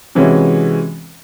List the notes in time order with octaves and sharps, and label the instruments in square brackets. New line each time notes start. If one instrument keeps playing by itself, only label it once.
[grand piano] C3 E3 G#3 C#4 F#4